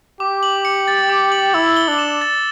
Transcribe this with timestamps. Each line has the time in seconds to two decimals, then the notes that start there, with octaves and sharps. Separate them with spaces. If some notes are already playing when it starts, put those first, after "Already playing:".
0.20 G4 D6
0.43 F#7
0.65 C#7
0.88 A6
1.09 D6
1.32 F#7
1.54 E4 E6
1.76 G7
1.88 D4
1.99 E7
2.21 A6